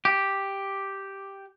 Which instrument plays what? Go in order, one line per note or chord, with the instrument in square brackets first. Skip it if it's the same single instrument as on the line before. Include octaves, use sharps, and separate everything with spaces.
[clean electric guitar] G4